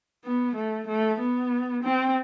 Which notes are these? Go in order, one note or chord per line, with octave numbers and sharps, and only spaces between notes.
B3
A3
A3
B3
C4